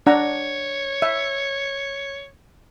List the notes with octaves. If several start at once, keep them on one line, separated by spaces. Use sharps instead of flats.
D4 C#5 F#5 A#5
E5